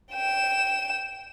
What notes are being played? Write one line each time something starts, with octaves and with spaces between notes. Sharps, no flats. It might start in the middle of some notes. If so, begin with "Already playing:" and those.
G5 E7